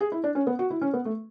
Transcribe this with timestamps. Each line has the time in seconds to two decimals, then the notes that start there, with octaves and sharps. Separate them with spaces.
0.01 G#4
0.12 E4
0.24 D4
0.35 C#4
0.47 B3
0.59 F#4
0.70 E4
0.81 C#4
0.93 B3
1.05 A3